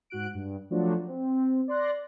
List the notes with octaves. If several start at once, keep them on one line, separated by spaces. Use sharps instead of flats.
G#2 F#4 F#6 D7
G2
F3 F#3 A3 D4 F4 F#4
C4
D5 C6 F#6 A#6